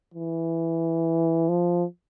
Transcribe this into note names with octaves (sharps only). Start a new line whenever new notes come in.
E3
F3